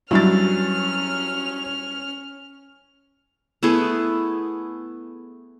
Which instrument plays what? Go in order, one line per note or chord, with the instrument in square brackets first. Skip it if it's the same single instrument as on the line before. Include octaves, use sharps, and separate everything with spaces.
[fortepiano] G2 E4 [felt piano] F#3 A6 [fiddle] C#4 F6
[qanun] A3 B3 E4 G#4